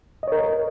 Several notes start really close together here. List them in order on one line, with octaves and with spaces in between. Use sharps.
D#5 C#5 A#4